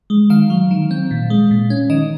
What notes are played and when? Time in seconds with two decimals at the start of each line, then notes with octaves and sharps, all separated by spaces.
0.10 G#3
0.30 D#3 F5
0.50 F#3
0.71 D#3
0.91 C4
1.11 A#2
1.30 G#3
1.51 A#2
1.70 C#4
1.90 D#3 D#5